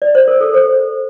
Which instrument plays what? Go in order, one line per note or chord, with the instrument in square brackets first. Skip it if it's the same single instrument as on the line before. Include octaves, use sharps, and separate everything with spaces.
[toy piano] D5
C5
A#4
A4
C5